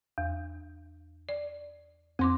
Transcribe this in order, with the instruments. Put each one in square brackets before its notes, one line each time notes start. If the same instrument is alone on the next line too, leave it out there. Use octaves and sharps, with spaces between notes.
[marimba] E2
D5
[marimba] F2 C6 D6 [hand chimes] C4